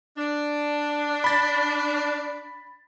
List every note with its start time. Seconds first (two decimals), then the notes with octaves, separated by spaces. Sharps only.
0.18 D4
1.24 B5 A6